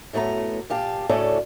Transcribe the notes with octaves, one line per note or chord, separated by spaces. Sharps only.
F#2 A2 A3 B3 A#5
A#2 G4 F5 A5
D2 A2 C#3 C#4 A4 D5